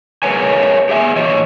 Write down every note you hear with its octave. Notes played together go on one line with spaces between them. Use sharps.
G#4 A#4 B4 C#5 G#5
G4 G#4 E5 G5 G#5
A#2 E3 G4 C#5 D#5